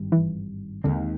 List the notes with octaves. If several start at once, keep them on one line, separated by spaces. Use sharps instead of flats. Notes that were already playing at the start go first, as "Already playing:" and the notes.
Already playing: G#1 G2 D#3 G3
E3
D#2 D3 D#3 G#3 C4